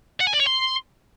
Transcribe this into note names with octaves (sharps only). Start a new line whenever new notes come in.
F#5
G#5
D5
C#5
C6